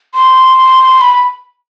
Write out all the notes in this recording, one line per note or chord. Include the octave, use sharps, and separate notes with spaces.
C6
B5